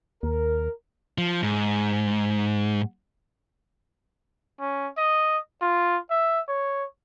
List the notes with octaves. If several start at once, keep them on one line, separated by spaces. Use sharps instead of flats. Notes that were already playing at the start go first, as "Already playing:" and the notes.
D#2 A#4
F3
G#2
C#4
D#5
F4
E5
C#5